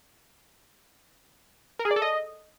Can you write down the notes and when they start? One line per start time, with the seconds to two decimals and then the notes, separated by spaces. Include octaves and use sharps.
1.79 A#4
1.85 G#4
1.91 D5
1.96 A4
2.02 D#5